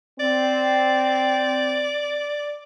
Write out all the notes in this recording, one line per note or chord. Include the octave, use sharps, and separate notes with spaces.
C4 D5